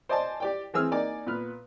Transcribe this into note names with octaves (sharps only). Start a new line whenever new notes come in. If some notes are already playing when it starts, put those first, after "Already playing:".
C5 D5 D#5 G#5 A5 C6
G4 D5 G5
E3 C4 G#4 E6 F6
A#3 D#4 D5 G#5
A#2 B3 B4 F6